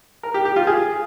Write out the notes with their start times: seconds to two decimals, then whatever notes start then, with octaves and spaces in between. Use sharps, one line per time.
0.23 A#4
0.34 G4
0.45 G4
0.56 F4
0.67 G#4